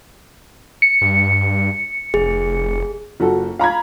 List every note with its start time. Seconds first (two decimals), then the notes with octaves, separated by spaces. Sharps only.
0.82 C#7
1.01 G2
2.14 F1 G#4
3.20 F#1 F4 F#4 A4
3.59 F5 A#5 B5 G#6